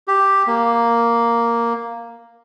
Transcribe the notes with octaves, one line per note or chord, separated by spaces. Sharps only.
G4
A#3